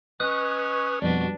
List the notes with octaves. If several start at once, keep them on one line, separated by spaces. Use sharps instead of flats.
C#4 B4 C#5 D#5 D#6 F#6
F2 B2 G3 D4 F#4 B4